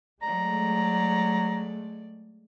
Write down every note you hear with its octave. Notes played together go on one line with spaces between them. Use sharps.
F#3 G#3 A3 D5 A#5